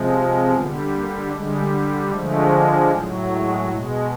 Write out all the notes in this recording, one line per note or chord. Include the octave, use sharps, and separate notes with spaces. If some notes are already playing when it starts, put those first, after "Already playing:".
Already playing: C3 F3 G#3
C4
D3 G3 B3
A#3
D3 G3 G#3
D3 F3 G#3 A3
A2 F#3
G#3
B2 G#3